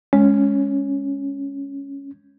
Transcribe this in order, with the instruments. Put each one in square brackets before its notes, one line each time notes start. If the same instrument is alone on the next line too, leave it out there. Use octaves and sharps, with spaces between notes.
[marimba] G#3 [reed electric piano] C#4